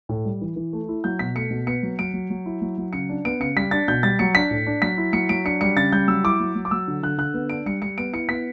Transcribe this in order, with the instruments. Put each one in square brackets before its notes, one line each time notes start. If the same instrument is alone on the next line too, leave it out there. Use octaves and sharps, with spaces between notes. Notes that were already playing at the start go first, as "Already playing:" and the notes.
[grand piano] A2
G3
E3
E3
A3
E4
F#3 G6
B2 B6
A3 C#7
B2
B3 C#7
F#3
F#3 D7
F#3
F#3
E4
F#3
F#3
C#3 C#7
D4
B3 D7
C#3 C#7
G3 B6
D4 A6
B2 G6
G3 A6
F#3 C#7
D4 B6
A2
D4
F#3 B6
E4
F#3 C#7
F#3 D7
D4 C#7
G3 C#7
C#3 A6
G3 G6
F#3 E6
E4 D6
F#3
F#3
D6
F#3 E6
D3
D3 F#6
D3 F#6
B3
D4 D7
G3 C#7
G3 C#7
B3 D7
E4 C#7
B3 B6